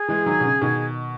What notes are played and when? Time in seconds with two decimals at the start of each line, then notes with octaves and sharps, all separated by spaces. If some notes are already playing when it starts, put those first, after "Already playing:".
Already playing: G#4
0.08 E3 G#3
0.26 D#3 F#3
0.40 B2
0.45 C#3
0.61 B2 D#3